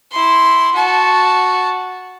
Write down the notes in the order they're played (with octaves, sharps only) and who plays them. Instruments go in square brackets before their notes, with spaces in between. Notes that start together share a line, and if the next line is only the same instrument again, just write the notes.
[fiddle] E4 C6
F#4 A5